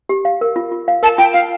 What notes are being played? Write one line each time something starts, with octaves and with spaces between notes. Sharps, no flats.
G4
F5
A#4
F4
F4
F5
A#4 A5
F4 G5
F4 F5